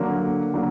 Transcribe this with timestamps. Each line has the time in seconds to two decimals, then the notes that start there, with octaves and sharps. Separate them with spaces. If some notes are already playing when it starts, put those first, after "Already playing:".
Already playing: D3 F#3 A#3
0.54 D3 F#3 A#3